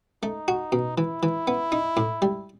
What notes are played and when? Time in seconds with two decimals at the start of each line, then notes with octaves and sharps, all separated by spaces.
0.23 A3 D#4
0.48 F#4
0.72 B2
0.97 E3 E4
1.23 E3
1.47 B3
1.72 D#4
1.97 A2
2.22 G3